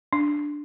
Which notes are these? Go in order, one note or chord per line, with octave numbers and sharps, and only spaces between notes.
D4